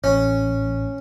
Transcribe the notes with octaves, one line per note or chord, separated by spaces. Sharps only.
A1 C#4